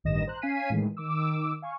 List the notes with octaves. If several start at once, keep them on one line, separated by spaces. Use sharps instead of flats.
A1 G2 D#3 D#5 A#6 E7
C5 A#5 F#6
C#4 F5 G#5 B6 C7 D#7
A2 D#3 E3 G#3
D#3 D6 E6
F5 G#5 C#6